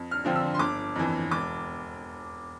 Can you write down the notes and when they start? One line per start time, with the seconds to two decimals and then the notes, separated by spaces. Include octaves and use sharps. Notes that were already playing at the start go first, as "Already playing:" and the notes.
Already playing: F2
0.11 F6
0.25 D3 F3 C4
0.36 E6
0.54 C6
0.59 G1 D6
0.95 F2 E3
1.31 E1 D6